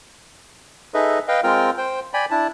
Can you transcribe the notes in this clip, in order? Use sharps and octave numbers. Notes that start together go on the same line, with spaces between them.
D#4 G#4 A4 B4 D#5 E5
B4 D#5 F5 G5
G#3 C4 F4 A#4 G5 F6
C5 G5
D5 G5 G#5 B5
D4 E4 A5